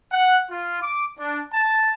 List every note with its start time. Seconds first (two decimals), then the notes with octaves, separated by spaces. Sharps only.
0.12 F#5
0.49 F4
0.82 D6
1.18 D4
1.54 A5